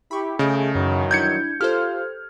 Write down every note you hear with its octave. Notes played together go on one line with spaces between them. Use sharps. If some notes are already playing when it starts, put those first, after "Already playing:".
E4 G4 B5 C#6
C#3 A3 G#4 D#5 G6 D7
F#2 D#3 E3 F#3
G3 D4 E4 G6 G#6 C#7
F4 G4 A4 C5 F6